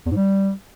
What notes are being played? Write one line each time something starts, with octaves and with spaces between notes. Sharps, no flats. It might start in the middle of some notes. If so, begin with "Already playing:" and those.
E2
G#2
G3